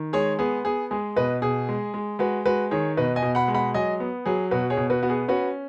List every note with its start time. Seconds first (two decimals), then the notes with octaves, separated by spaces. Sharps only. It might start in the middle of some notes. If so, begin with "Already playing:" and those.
Already playing: D#3
0.13 G#3 G#4 C#5
0.39 B3 G#4
0.65 B3 G#4
0.91 G#3 G#4
1.16 B2 B4 D#5
1.42 B2 G#4
1.69 G#3
1.94 G#3
2.19 G#3 F#4 B4
2.46 G#3 F#4 B4
2.71 D#3 G#4 C#5
2.97 B2 B4 D#5
3.16 D#5 G#5
3.22 B2
3.35 F#5 B5
3.48 G#3
3.55 F#5 B5
3.74 F#3 D#5 G#5
4.00 B3
4.26 F#3 G#4
4.51 B2 F#4 B4
4.70 G#4 C#5
4.77 B2
4.90 F#4 B4
5.03 B3 F#4
5.10 G#4
5.28 C#4 F#4 B4